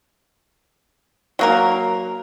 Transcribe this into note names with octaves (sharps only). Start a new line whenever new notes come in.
F#3 A#3 A#4